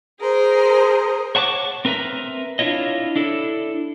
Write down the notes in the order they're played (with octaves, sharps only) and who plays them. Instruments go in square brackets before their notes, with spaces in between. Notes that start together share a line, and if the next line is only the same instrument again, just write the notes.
[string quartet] G#4 A#4 C5
[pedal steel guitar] C#5 F#5 A5 C#6 D6
C4 A#4 B4 E5 A#5
D4 E4 F4 C#5 D#5
D4 E4 A4